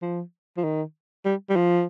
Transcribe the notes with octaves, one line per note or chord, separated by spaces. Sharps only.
F3
F3
D#3
G3
G3
F3